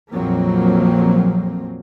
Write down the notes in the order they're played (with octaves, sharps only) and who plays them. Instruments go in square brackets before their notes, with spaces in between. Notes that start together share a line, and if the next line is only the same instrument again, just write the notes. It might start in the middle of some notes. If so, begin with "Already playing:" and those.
[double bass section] A#1 F2 F3 F#3 A#3 C4